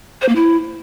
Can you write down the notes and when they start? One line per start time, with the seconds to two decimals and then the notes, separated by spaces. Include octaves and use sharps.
0.22 C5
0.29 A#3
0.35 E4